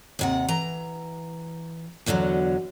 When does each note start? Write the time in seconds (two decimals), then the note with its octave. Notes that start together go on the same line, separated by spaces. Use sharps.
0.19 D#2 C3 F#5
0.48 E3 A#5
2.06 E2 B2 D3 D#3 F#3